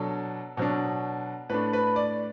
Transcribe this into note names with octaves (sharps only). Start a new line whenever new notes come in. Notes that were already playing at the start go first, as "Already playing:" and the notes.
Already playing: B2 F#3 D4 A4
B2 F#3 D4
A2 A3 D4 B4
B4
D5